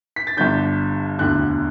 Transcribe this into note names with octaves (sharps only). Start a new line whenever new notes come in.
B6
A6
G1 G2 D3 G6
E1 D2 D3 F#6